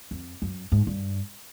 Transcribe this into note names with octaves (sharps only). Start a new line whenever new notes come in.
F2
F#2
G#2
G2